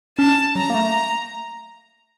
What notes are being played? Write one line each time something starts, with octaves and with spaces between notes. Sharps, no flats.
C#4 A5
F#3 A#5
A#3
A3